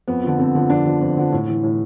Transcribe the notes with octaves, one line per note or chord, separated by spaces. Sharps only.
F2 B3
D3 F3
F2 C4
D3 F3
F2 D4
D3 F3
F2
D3 F3
A2
E3
A2